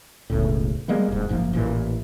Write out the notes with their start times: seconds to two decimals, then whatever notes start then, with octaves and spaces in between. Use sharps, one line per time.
0.30 E1 C#2 A2
0.88 G3 G#3 A#3 B3
1.08 E1 G#2
1.29 F#1 G#2 F3 A#3
1.53 A1 A#2 E3